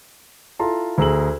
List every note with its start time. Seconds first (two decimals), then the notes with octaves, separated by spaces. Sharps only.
0.59 E4 F4 A4 A5 A#5 C6
0.98 D2 G#4 A#5 E6 F#7